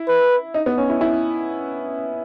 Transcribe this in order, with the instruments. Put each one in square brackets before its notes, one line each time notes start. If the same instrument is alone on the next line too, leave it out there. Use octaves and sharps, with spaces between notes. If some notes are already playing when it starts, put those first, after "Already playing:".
Already playing: [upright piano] E4
[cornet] B4
[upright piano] D#4
B3
C#4
E4
E4